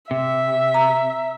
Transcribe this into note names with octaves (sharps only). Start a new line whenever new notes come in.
C3 E5
A#5